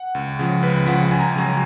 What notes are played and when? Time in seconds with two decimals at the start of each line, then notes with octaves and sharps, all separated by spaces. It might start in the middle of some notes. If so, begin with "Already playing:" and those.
Already playing: F#5
0.15 C#2
0.39 C#3 F3
0.62 C#2 B4
0.86 C#3 F3 F#5
1.11 C#2 G#5
1.20 A#5
1.27 G#5
1.36 C#3 F#3